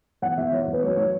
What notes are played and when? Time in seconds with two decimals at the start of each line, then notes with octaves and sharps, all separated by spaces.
0.22 E2 F#5
0.37 E2 E5
0.52 E2 C#5
0.63 C#5
0.68 E2
0.73 B4
0.83 F#3 C#5
0.97 F#3 C#5